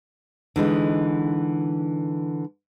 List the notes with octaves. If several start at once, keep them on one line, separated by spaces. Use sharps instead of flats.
D3 E3 G#3 D#4